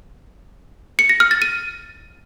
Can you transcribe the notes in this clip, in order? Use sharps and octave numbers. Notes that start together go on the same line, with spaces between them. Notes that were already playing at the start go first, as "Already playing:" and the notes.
C#7
A#6
F6
A6
D#7